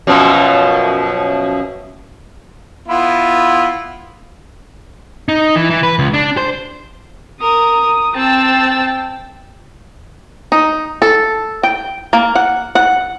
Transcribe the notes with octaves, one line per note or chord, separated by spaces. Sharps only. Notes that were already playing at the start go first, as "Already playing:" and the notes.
F#2 B2 F3
B3 E4 F4
D#4
E3
E3
B4
C#2
D4
C5
A#4 D#6
C4 G5 A5 E6
D#4
A4
G5
A#3
F#5
F#5